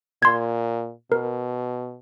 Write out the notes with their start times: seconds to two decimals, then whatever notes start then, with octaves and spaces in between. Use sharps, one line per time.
0.23 A#2 C6 G#6
1.12 B2 A#4